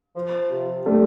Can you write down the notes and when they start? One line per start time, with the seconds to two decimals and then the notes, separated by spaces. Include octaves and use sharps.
0.16 F3
0.50 C3
0.86 G3 A3